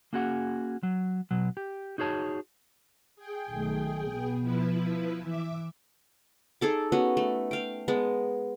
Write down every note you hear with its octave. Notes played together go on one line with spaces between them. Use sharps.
A#3 C#4 F#4 G#4 F#5
F#3
B2 F#3
G4
D#4 F#4 G#4 C#5 A5
G#4 G5
B1 D#3 A3
B2 B3
F3 E4 B4
E3 E5 D6
D#4 G#4 A4 D6
B3 C#4 F#4
A3
F5 G5
G#3 B3 A5